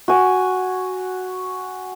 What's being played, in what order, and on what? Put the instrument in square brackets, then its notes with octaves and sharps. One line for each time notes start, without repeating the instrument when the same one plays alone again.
[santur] F#4 G#5